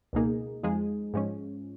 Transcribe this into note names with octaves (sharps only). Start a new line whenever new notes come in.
C#2 B2 A#3 D#4 G#4
F2 F3 G#3 D#4 G#4
G#2 F3 G#3 C#4